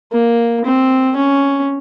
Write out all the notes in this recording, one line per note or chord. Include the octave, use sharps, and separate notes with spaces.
A#3
C4
C#4